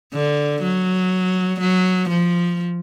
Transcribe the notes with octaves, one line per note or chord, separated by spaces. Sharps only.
D3
F#3
F#3
F3